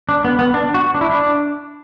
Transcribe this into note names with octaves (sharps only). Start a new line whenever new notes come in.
D4
B3
B3
D4
F#4
D4
E4
D4